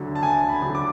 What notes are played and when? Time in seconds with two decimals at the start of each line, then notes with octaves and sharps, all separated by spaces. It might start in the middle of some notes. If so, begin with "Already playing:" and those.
Already playing: D2 D3 F#3
0.15 A5
0.23 D2 G#5
0.49 B5
0.62 D3 F#3
0.75 D6